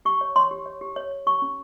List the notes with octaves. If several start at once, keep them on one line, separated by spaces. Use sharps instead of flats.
G4 C#6
C#5
C#5 C6
G4
C#5
G4
C#5
C#5
G4 C#6
C#4